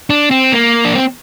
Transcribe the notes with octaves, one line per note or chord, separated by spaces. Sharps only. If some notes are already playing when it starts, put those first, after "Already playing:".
D4
C4
A#3
D4
C4